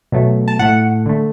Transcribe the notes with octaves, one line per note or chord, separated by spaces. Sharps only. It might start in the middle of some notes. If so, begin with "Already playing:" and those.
B2 F#3 A3
A5
A2 A3 F#5
D3 A3